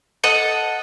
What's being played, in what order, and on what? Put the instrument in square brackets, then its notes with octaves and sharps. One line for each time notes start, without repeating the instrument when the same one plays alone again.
[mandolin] A4 D#5 F#5